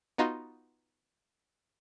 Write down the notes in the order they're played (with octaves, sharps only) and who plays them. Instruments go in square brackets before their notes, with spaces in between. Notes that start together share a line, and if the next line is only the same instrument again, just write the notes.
[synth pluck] B3 D#4 F4 F#4